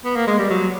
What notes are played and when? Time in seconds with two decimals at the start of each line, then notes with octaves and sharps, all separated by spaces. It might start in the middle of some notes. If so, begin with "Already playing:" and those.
0.05 B3
0.16 A#3
0.27 G#3
0.39 G3
0.50 F#3